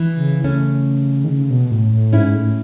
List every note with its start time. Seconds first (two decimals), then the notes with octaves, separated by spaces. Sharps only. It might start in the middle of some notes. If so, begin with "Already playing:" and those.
Already playing: E3
0.16 C#3
0.44 A3 C#4
1.24 D#3
1.29 C#3
1.50 B2
1.71 A2
1.92 A2
2.13 G#2 C#4 E4
2.34 A2